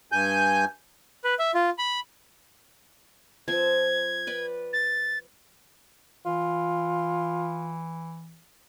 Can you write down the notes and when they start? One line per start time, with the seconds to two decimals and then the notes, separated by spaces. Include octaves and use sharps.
0.12 G2 G#5 G6
1.24 B4
1.39 E5
1.55 F4
1.78 B5
3.48 F3 C4 A5 G#6
4.27 B4 D5 G5
4.73 A6
6.26 E3 F4